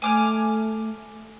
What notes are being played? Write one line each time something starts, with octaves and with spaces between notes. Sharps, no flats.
A3 G#5 D6 F6